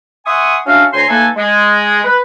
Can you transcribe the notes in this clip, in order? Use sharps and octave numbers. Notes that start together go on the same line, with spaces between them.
E5 F#5 G#5 C6 C#6 D#6
C#4 D4 F#4 E5 F5
D2 C#5 G#5 A#5 C6
A3 A#3 D#4 A4 B4 G#5
G#3
B4